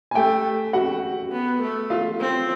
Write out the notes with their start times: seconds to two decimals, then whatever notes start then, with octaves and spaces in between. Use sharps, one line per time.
0.11 G#5
0.15 A3 G4 G5
0.73 F#4 F#5
1.32 B3
1.61 A3
1.90 F4 F5
2.20 C4